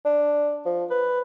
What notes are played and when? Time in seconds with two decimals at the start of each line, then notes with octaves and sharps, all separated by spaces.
0.05 D4
0.66 F3
0.90 B4